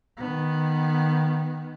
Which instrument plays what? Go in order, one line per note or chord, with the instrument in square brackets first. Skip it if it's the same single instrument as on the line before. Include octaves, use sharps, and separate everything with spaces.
[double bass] D#3 B3